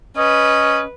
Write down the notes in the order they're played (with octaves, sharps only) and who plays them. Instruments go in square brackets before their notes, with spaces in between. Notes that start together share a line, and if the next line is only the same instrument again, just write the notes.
[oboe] C#4 [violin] B4 [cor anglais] D#5